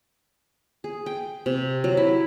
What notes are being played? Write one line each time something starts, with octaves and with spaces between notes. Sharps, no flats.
G#4
G5
C3
F#3
E4